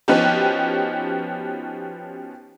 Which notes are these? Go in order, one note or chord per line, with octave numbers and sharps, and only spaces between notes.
F3 B3 C#4 D#4 F#4 G4